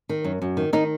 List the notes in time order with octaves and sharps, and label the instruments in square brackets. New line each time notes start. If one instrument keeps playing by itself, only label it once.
[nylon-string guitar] D#3
F#2
F#2
D#3
D#3 D#4